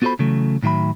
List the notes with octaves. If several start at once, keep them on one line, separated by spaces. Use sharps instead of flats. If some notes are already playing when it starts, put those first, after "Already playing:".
B3 F4 F#4 A4 C5 B5
C#3 E3 F#3 A3
A2 D#3 F#3 E5 B5